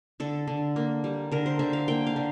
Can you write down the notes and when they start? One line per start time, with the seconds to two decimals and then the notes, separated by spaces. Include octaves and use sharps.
0.20 D3 A4
0.47 D3
0.76 A#3
1.04 G3
1.32 D3 A#4
1.46 C5
1.59 D3 E5
1.73 F5
1.88 A#3 G5
2.07 F5
2.16 D3